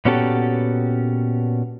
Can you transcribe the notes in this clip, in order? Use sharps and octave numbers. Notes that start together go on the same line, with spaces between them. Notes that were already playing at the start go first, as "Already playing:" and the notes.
A#2 B3 C#4 F#4 G4 A4